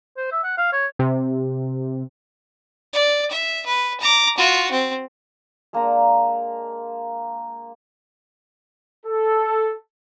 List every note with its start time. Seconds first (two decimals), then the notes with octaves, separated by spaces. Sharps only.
0.17 C5
0.32 E5
0.44 F#5
0.57 F5
0.73 C#5
0.99 C3
2.93 D5
3.31 E5
3.66 B4
4.00 A#5 D6
4.37 F4 F#4
4.71 C4
5.73 G#3 A#3 D4 A#5
9.06 A4